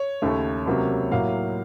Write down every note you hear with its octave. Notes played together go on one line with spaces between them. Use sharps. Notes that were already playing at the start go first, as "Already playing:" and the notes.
Already playing: C#5
D#2 C#3 A3
C#2 C3 F#3 A#3
A2 F#3 A#3 F5